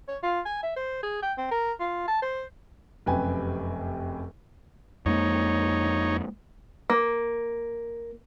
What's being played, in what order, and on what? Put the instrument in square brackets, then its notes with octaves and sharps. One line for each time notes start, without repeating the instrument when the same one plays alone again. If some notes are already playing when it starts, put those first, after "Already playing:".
[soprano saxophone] C#5
F4
G#5
E5
C5
G#4
G5
C4
A#4
F4
A5
C5
[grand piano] F1 F#2 C3 B4 G5 G#5
[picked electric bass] F2 G#3 A#3 [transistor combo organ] D#4 C#5
[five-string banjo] A#3